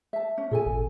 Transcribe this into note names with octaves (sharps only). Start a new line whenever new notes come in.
E5 A5
C#4
A#2 G#4 A4 G#5
G#1